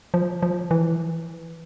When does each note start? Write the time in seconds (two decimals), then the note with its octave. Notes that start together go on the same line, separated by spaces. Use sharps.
0.14 F3
0.43 F3
0.71 E3